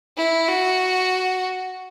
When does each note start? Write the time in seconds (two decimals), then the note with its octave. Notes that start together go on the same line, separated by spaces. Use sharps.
0.17 E4
0.48 F#4